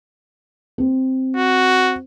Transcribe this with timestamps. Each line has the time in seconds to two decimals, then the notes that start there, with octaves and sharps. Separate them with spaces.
0.78 C4
1.37 F#4